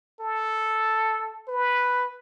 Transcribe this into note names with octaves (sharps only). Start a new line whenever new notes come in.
A4
B4